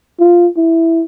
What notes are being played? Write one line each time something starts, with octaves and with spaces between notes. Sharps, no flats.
F4
E4